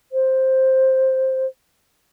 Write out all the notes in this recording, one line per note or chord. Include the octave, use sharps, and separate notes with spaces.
C5